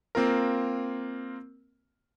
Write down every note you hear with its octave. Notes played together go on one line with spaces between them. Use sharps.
A#3 C4 F4 A#4